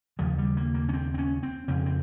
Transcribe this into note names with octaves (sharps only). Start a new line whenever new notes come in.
D#2 C#3 F3
G3
A#3
A#3
C#4
C4
C4
C#4
C4
F2 C#3 C4
C4